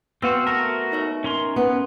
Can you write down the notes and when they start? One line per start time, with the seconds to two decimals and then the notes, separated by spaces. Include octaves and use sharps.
0.22 B3 C4 F4 F#4 E6
0.47 A3 F#4 A#4 A5 A#6
0.92 D#4 C#5 E5
1.24 C#4 A#4 C6
1.56 B3